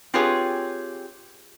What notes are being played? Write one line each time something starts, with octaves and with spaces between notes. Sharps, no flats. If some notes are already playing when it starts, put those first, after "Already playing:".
C4 F4 G4 G#4 B4 C#5